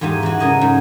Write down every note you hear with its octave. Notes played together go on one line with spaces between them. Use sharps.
E2 G#2 F4 G4 G#5 A5
E3 F#4
C#3 F#3 A#4 D#5 G#5
G#2